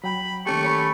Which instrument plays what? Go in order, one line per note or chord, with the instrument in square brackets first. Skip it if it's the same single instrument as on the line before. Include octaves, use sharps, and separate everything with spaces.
[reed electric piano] F#3 G5 [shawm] B5
[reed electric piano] D#3 C#4 G4 [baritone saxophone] A3 [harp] A#3 G5 [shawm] C#6
[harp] C#5 G#5 B5